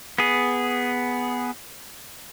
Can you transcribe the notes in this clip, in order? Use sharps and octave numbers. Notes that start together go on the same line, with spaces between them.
B3 G#4